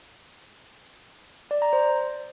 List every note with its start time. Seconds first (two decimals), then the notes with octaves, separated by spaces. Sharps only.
1.51 D5
1.62 A#5
1.73 C5